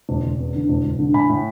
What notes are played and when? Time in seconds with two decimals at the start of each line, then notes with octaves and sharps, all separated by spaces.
0.09 E1
0.24 E1
0.39 E2
0.54 D3
0.69 E1
0.84 E1
0.99 D3
1.14 A2 G#5 B5
1.29 A2